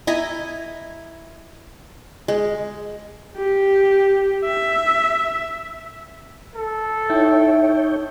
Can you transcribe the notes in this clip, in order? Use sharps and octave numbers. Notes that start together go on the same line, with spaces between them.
E4 D#5 G#5 A#5
G#3
G4
E5
A4
D#4 E4 C#5 E5 G5